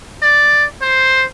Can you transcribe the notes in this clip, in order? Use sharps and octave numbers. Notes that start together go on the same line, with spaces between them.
D5
C5